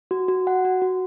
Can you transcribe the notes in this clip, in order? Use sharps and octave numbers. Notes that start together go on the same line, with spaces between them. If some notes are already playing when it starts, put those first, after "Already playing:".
F#4
F#4
F#5
F#4
F#4